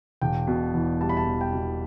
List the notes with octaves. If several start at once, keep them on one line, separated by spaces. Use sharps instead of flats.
E1 G5
B2
E2
G3 A5
B5
A5
E1
G5
B2